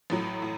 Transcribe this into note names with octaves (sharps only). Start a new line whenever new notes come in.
A1 A2 F#3
A2